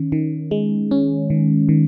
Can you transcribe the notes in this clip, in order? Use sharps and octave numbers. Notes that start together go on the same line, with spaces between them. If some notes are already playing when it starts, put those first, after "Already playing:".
Already playing: D#3 C#4
D#3
G#3
C#4
D#3
D#3